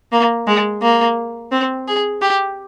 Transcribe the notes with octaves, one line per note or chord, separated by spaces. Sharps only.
A#3
G#3
A#3
C4
G#4
G4